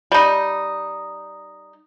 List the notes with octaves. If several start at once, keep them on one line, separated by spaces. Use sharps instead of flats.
G3 D#4